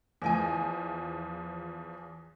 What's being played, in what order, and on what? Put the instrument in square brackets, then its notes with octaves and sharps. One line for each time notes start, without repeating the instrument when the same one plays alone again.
[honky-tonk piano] E2 F3 [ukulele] E4 D#5 G#5